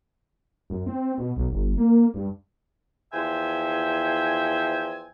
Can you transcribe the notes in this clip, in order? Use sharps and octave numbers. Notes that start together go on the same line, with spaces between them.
F#2
C4
B2
B1
G1
A#3
G2
E2 F3 C5 E5 G5 G#5